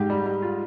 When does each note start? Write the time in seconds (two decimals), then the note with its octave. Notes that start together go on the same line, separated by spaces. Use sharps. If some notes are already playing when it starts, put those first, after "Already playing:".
Already playing: G#2 G4
0.10 G3
0.26 G3
0.42 F4